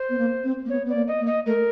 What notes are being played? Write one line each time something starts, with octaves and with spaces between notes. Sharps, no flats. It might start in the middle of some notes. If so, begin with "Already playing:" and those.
Already playing: C5
B3
A#3
C4
A#3
B3 C#5
B3 D5
A#3
D#5
A#3
D#5
A3 A#4